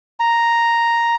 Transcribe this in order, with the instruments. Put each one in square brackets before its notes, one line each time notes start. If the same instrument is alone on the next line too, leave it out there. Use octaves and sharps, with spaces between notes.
[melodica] A#5